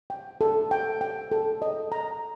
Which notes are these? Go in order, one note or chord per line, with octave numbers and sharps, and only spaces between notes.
G5
A4
G5
G5
A4
D#5
A#5